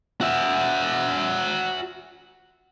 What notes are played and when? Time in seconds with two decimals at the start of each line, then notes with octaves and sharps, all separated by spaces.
0.21 F#4 E5